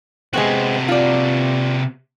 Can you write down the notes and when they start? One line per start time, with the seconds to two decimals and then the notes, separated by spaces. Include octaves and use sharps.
0.33 C3 G#3 B3 C4 F#4
0.88 F4 D5